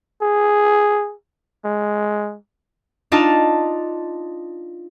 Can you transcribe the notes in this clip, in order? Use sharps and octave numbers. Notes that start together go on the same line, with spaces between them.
G#4
G#3
D4 D#4 F4 A5